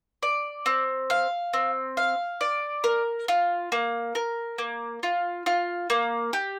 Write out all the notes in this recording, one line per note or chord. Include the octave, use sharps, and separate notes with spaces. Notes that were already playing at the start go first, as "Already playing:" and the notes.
D5
C4
F5
C4
F5
D5
A#4
F4
A#3
A#4
A#3
F4
F4
A#3
G4